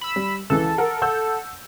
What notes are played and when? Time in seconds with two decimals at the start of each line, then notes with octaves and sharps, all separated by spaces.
0.01 B5 E6
0.16 G3
0.50 C#2 E3 A4
0.78 A#4 F#5
1.02 F#5 E6 G6